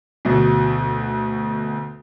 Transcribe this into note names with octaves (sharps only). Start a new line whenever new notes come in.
D2 B2